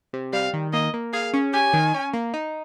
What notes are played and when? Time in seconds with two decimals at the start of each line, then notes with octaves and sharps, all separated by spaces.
0.13 C3
0.33 G3 F5
0.53 D#3
0.73 A#3 D#5
0.94 A#3
1.13 G#4 F5
1.34 C#4
1.53 G4 G#5
1.73 D#3
1.94 C#4
2.14 A#3
2.34 D#4